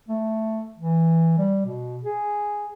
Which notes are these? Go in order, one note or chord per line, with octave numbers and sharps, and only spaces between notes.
A3
E3
G3
B2
G#4